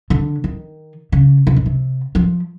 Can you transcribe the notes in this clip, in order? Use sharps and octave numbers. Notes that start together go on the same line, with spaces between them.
D3
D#3
C#3
C3
B2
C3
F3